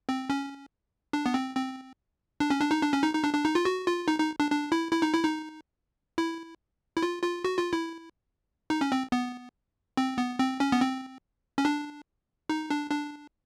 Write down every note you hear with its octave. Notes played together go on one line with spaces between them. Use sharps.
C4
C#4
D4
B3
C4
C4
D4
C#4
D4
D#4
D4
C#4
D#4
D#4
D4
D4
D#4
F4
F#4
F4
D#4
D#4
D4
D4
E4
E4
D#4
E4
D#4
E4
E4
F4
F4
F#4
F4
E4
D#4
C#4
C4
B3
C4
B3
C4
C#4
B3
C4
C#4
D4
D#4
D4
D4